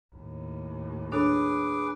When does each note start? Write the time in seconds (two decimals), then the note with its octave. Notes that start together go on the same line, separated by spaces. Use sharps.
0.15 D#2 A2
1.12 D4 G#4 A4 B4 C#5 D6